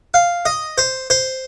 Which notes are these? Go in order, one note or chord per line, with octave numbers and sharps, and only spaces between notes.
F5
D#5
C5
C5